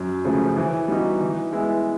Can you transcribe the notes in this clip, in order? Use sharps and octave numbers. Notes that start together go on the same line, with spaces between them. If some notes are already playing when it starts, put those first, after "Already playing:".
Already playing: F#2
C#3 F3 A3 C#4
E3
G3 B3 D#4 F#4
E3
G#3 B3 E4